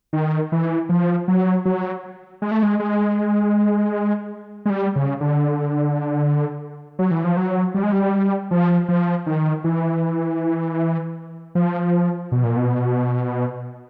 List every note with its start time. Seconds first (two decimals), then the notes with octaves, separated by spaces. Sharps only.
0.13 D#3
0.52 E3
0.89 F3
1.28 F#3
1.65 F#3
2.42 G#3
2.51 A3
2.63 G#3
2.79 G#3
4.66 G#3
4.70 G3
4.96 C#3
5.21 D3
6.99 F#3
7.11 E3
7.24 F3
7.37 F#3
7.74 G3
7.83 G#3
7.92 G3
8.51 F3
8.88 F3
9.26 D#3
9.64 E3
11.55 F3
12.32 B2
12.44 A#2
12.57 B2